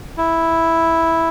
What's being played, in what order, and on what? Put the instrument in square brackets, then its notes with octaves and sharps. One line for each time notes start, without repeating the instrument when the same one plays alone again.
[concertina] E4